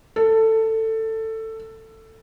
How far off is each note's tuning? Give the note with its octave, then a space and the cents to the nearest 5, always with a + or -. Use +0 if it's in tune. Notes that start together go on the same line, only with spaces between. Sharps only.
A4 +15